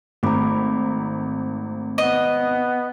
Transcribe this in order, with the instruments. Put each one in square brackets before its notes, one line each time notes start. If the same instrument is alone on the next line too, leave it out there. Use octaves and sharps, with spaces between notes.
[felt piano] G#1 A#5 [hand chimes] A3 B5 D6
[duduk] B3 [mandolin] D#5